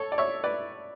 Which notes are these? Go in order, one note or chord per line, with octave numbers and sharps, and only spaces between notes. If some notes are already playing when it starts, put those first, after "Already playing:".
Already playing: A4 C#5
D5
C#5 E5
B4 D5